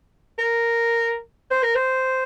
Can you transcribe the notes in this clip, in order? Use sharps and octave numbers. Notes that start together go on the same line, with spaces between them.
A#4
C5
A#4
C5